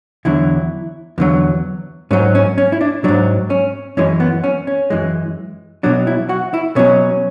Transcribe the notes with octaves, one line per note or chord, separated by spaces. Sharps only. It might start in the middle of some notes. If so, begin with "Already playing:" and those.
E2 D3 F#3 E4
E2 D3 F#3
G#2 F#3 C#4
C#4
C#4
E4
D4
G#2 F#3 D4
C#4
F#2 E3 G#3 C#4
B3
C#4
C#4
F#2 E3 G#3
B2 F#3 D4
E4
F#4
E4
B2 F#3 C#4